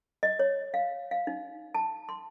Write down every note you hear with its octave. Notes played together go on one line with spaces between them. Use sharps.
D#5
C#5
F5
F5
D#4
A5
C6